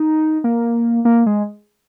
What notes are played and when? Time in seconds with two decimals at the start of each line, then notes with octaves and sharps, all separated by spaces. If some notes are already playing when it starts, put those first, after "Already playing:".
Already playing: D#4
0.44 A#3
1.05 A#3
1.26 G#3